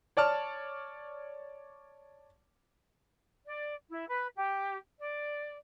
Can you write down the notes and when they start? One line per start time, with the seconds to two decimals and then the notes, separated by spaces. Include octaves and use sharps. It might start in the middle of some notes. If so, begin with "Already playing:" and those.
0.17 C#5 D5 A5 F6
3.45 D5
3.90 E4
4.08 B4
4.35 G4
4.99 D5